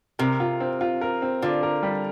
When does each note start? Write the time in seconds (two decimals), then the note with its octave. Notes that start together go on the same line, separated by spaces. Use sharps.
0.19 C3 A#4
0.40 F4
0.60 C4
0.81 F4
1.01 A#4
1.22 C4
1.42 D3 F4
1.63 A#4
1.83 G3